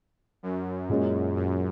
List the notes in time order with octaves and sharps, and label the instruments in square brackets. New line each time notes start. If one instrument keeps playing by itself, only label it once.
[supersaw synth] F#2
[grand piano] A#2 G#3 C#4
[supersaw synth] F#2